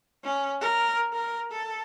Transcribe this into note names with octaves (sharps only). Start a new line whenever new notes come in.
C#4
A#4
A#4
A4